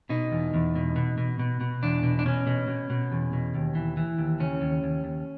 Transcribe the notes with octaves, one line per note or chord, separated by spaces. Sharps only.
B2 D#4
E2
E2
B2
B2
B2
B2
B2
E2 D4
B2
D4
B2 C#4
B2
B2
B2
E2
B2
D#2
E3
E3
D#2
C#3 C#4
D#2
D#2
D#2